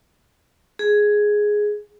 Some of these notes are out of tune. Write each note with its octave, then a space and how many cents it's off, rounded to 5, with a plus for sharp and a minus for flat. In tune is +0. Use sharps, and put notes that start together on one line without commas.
G#4 +5